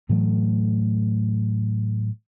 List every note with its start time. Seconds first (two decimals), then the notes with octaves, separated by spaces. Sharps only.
0.09 A2 E3 F#3 A3